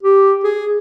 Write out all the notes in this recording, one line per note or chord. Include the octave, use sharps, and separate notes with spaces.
G4
G#4